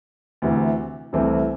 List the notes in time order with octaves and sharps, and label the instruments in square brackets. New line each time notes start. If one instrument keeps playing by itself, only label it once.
[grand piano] D2 C3 E3
C2 C3 E3 A3 C4